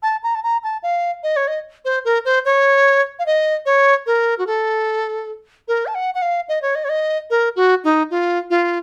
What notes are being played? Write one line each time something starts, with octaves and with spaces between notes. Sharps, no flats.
A5
A#5
A5
A#5
A5
F5
D#5
C#5
D#5
C5
A#4
C5
C#5
F5
D#5
C#5
A#4
F#4
A4
A#4
A5
F#5
F#5
F5
D#5
C#5
D#5
C#5
D#5
A#4
F#4
D#4
F4
F4